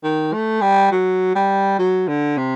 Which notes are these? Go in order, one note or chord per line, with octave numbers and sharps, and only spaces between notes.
D#3
A3
G3
F#3
G3
F#3
D3
C3